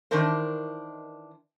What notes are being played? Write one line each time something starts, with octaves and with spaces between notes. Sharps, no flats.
D#3 E3 D4 D#4 A#4 C5